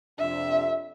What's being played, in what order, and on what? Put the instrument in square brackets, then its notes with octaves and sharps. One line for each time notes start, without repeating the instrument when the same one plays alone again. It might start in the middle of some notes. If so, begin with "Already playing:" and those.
[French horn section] F2 C3 D4 [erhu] E5